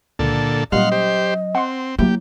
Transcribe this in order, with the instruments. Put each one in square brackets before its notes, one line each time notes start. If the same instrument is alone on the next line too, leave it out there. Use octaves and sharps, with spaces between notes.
[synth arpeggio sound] C#2 [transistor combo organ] A#2 D3 A4
[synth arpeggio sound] A#2 G3 [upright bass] F#3 C#4 [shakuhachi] D#5 [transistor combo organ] F5 F#5 C6
[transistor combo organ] G4 C5
[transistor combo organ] C4 [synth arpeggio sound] F#5 C6
[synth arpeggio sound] F#3 E4 [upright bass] A#3 [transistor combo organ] G4